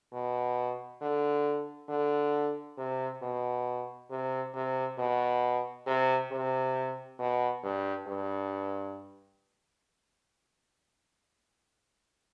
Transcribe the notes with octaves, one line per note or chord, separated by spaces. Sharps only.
B2
D3
D3
C3
B2
C3
C3
B2
C3
C3
B2
G2
G2